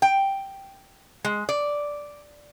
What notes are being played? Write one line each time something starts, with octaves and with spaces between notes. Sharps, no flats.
G5
G#3
D5